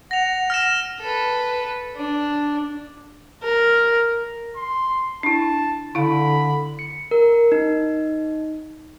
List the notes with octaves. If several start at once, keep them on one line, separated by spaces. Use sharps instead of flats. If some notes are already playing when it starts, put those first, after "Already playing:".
F#5 A#6 F7
F6 A#6 E7
A4 B4
D4
A#4
C6
D4 E4 A5
D3 E4 F5 B5
C#7
A#4
D#4